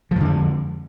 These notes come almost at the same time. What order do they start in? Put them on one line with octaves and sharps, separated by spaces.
F3 F2 D3 G#3